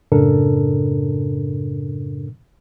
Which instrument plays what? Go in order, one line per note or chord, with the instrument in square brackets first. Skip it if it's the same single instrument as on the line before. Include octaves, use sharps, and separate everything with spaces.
[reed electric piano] F#2 A2 C#3 D4 A4 A#4